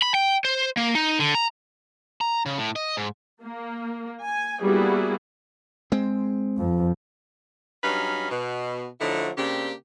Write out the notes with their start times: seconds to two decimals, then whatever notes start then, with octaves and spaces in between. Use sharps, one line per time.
0.02 B5
0.14 G5
0.45 C5
0.77 A#3
0.95 D#4
1.19 D3
1.35 A#5
2.21 A#5
2.46 C#3
2.58 A2
2.76 D#5
2.97 G#2
3.42 A#3
4.24 G#5
4.62 G3 A#3 B3 E4 F#4 G#4
5.92 G#3 C4
6.58 F2
7.84 G2 F#3 C#4 D#4 F5 B5
8.30 B2
9.00 D3 F3 F#3 A3 D#4 E4
9.37 C#3 A#3 C4 D4 G4